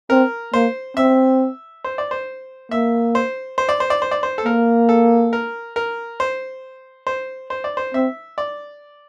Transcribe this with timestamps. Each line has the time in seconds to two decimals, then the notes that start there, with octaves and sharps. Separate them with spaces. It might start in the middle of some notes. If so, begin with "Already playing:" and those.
0.10 C4 A#4
0.54 A#3 C5
0.97 C4 E5
1.84 C5
1.98 D5
2.11 C5
2.71 A#3 E5
3.15 C5
3.58 C5
3.69 D5
3.80 C5
3.90 D5
4.02 C5
4.11 D5
4.23 C5
4.38 A4
4.45 A#3 A#4
4.89 A4
5.33 A#4
5.76 A#4
6.20 C5
7.07 C5
7.50 C5
7.64 D5
7.77 C5
7.94 C4 E5
8.38 D5